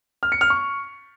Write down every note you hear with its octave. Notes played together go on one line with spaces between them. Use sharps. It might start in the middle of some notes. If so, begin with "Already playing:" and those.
F6
C#7
F6
C#6